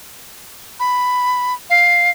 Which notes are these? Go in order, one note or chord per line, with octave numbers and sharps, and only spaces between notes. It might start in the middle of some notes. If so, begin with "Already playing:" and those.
B5
F5